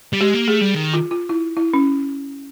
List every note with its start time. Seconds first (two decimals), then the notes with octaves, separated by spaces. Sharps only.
0.13 G3
0.21 G#3 G4
0.34 A#3
0.48 A3 G#4
0.61 G3
0.75 D#3
0.94 F4
1.11 F4
1.29 E4
1.57 E4
1.74 C#4